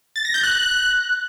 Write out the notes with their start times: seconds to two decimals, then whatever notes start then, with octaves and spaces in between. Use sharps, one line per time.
0.16 A6
0.25 A#6
0.34 G6
0.43 F#6